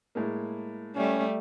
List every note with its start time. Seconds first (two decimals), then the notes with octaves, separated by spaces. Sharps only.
0.15 A2 G#3 A#3
0.95 G3 A3 C#4